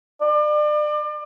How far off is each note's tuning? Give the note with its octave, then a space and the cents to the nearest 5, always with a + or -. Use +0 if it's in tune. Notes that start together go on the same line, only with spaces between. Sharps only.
D5 +35